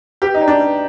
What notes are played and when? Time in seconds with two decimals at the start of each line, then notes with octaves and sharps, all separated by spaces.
0.22 G4 B4
0.34 D#4
0.41 D5 G5 A#5
0.48 D4
0.60 B4